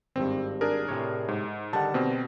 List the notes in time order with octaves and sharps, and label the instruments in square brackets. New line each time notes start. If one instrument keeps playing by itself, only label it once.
[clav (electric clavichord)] G#1 G2 [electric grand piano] C4
[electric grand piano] D4 G#4 A#4
[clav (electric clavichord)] A2 C3 C#5
[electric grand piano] G#2
[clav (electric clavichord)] D3 D#3 G3 [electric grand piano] F#5 A5
[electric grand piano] B2 C4